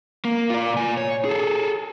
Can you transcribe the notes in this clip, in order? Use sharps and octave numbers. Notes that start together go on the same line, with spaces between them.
A#3
F4 D5
A#2 G#5
C#5
G#4 A4